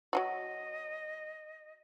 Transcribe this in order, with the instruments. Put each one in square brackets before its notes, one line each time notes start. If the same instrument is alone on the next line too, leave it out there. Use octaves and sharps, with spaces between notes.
[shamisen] F#3 F4 F#4 [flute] D#5